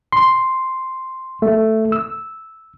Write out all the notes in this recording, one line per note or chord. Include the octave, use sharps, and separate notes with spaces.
C6
A3
E6